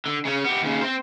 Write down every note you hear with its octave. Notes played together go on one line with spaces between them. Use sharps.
D3
C#3 C#4
B3 G4
D#2 C#3
C4 C5